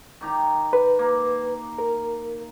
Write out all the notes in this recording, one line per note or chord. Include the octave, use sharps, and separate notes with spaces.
D#3 G4 A#5
B4
A#3
A#4